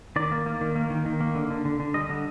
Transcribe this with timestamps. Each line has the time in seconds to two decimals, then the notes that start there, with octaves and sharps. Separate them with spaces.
0.16 D#3 D5
0.31 A#3
0.46 A#3
0.61 D#3
0.76 A#3
0.90 D#3
1.06 D#3
1.21 A#3
1.35 D3
1.51 D3
1.65 D3
1.80 D3
1.94 G3 D#5
2.09 D3